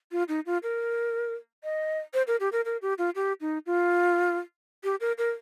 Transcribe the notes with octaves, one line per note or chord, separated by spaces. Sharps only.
F4
D#4
F4
A#4
D#5
C5
A#4
G4
A#4
A#4
G4
F4
G4
D#4
F4
G4
A#4
A#4